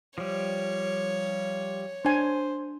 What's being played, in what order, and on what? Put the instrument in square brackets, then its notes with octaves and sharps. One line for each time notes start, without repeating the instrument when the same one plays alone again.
[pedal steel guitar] F3 G3 [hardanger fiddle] C#5
[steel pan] D4 G#5 [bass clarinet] C5